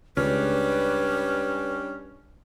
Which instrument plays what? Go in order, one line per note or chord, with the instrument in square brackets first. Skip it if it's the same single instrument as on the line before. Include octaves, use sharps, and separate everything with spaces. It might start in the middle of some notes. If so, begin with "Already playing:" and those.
[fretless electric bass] C#2 [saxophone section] G3 C#4 D4 [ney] B4